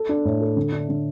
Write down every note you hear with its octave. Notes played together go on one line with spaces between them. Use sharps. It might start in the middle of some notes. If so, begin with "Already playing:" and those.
Already playing: A4
D4
A2
A4
D3
D4
D3